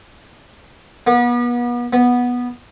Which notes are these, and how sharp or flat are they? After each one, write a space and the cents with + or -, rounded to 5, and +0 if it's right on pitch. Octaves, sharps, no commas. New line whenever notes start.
B3 -35
B3 -10